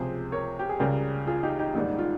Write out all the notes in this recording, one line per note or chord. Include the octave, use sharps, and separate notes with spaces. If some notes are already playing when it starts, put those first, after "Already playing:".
Already playing: C#2 C3 F3 G#4 C5
A#4 C#5
G4
G#4
C#2 C#3 G3 G4 A#4
F4 G#4
D#4 G4
D#4 G4
A#1 G#2 D#3 G3 D#4
F4